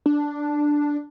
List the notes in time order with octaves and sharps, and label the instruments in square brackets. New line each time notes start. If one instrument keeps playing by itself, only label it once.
[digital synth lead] D4